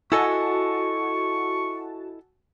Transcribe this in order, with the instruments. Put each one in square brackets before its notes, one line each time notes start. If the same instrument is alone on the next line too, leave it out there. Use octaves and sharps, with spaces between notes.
[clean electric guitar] E4 A4 D#5 [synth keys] F#4 A5 [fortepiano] G#5 E6 [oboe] C#6